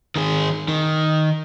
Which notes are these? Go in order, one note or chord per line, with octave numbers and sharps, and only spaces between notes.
D#3 G#4
D#3